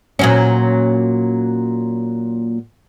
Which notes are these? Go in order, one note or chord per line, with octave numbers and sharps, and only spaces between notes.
A#2 F#3 C#4